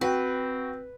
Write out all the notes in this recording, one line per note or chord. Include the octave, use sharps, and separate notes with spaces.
C4 F#4 B4 G5